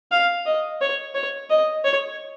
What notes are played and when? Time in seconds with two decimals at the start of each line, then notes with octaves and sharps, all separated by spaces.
0.11 F5
0.46 D#5
0.81 C#5
1.15 C#5
1.50 D#5
1.84 C#5